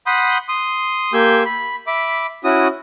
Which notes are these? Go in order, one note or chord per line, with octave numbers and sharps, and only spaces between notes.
F#5 B5 C6 D#6 G6
C6 D#6
A#3 G4 G#5 C6 E6 G6
B5
E5 B5 D6
C#4 E4 F#4 D#6